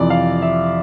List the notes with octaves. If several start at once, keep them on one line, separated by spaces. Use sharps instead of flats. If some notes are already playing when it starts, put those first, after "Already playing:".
Already playing: F2 C3 E3 D5
F5
E5